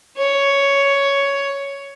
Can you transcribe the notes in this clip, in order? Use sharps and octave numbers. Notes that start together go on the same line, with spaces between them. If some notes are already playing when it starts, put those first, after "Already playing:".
C#5